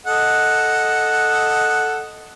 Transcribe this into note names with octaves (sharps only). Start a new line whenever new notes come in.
A4 D#5 F#5